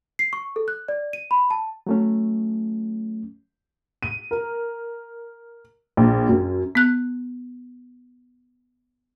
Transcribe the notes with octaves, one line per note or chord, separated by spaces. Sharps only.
C7
C#6
A4
F#6
D5
D#7
B5
A5
F#3 A3 C#4
D#7
A#4
A#1
F#2
B3 F#6